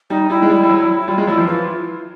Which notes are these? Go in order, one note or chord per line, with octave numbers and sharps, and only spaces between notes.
G3 D#4
G3 E4
G#3
G3
G3
F#3
E4
G3 F4
G#3
F#3 E4
F3
E3 F4